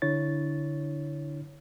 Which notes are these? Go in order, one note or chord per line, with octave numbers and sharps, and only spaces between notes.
D3 D4 E4 C#5 A6